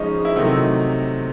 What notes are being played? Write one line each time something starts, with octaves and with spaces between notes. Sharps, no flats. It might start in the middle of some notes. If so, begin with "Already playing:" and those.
Already playing: C#3 F3 G#3 C#4 D#4
E4
C3 D#3 F#3 A3 D#4